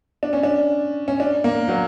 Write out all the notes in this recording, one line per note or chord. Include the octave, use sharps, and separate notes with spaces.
D4
C#4
D4
C#4
D4
A#3
F#3